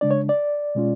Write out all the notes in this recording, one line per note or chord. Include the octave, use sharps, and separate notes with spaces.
C#3 G#3 D4 D5
C#5
D5
B2 G#3 C#4 F4